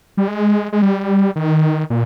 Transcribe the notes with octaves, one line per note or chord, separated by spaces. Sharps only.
G3
G#3
G#3
G3
D#3
A#2